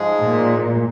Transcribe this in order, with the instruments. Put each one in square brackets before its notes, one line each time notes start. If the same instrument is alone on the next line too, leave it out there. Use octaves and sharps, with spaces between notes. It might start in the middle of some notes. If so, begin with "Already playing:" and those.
Already playing: [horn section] G#2 F3 G#3
[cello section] A#2